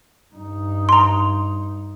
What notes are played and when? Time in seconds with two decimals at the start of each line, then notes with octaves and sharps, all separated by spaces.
0.35 G2 D#4
0.89 A#5 C6